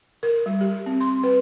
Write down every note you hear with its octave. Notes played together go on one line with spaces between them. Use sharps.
A#4
G3
G4
C4
C6
B4